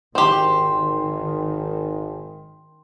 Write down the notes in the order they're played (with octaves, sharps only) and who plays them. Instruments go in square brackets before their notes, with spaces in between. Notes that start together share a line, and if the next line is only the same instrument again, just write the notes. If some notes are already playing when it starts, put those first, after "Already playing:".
[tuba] G#1 [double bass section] D#3 [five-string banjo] C4 G4 [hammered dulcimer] G5 C6